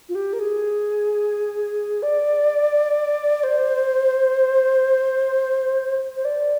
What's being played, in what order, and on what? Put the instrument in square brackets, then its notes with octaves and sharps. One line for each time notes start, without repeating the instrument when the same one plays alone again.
[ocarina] F4
G4
A#4
G#4
D5
C5
C5
D5